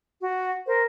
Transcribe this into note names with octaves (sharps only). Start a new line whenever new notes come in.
F#4
A#4 C5